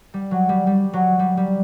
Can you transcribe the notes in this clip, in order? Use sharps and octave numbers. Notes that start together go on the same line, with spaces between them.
G3
F#3
G3
G3
F#3
G3
G3